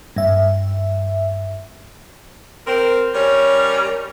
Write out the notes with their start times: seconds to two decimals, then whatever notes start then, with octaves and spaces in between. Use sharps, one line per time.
0.16 G2 E5
2.67 C4 A#4
3.14 G3 C#4 A#4 C#5